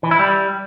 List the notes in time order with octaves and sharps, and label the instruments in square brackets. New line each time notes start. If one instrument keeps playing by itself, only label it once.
[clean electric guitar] E3
E4
G3